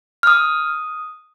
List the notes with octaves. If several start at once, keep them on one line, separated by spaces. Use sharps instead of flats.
F6
D#6